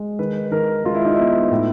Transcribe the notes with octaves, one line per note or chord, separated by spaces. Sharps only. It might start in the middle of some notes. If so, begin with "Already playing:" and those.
Already playing: G#3
D#3 B4
D#3 A#4
G#3 F4
E4
D#4
B3 E4
A2